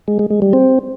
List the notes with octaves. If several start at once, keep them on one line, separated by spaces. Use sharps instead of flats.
G#3
G#3
G#3
G3
C4